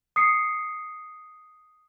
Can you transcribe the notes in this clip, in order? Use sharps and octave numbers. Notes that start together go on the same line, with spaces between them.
D#6 C7 C#7